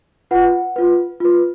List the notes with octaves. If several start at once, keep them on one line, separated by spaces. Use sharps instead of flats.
F4 B4 F#5
F4 B4
F4 B4